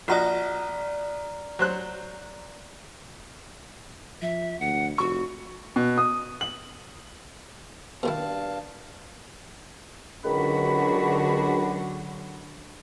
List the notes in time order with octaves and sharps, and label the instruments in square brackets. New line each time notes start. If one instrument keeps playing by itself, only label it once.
[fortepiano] A#1 F#4 D#5 [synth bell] D5 A#5 F6
[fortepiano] F#3 C5 F#6
[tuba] F3 [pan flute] E5
[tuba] D2 [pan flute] F#5
[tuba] F1 [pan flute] F#4 [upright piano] C#6
[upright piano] B2
D#6
F#7
[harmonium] G2 F5 A5 [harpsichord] B2 D#3 E4
[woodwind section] C#2 D#3 B5 [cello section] D3 F#3 F#4